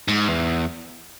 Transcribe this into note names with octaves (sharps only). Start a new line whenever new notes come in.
G#2
E2